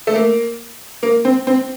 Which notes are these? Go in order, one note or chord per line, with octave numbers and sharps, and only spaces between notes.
A3
A#3
A#3
C4
C4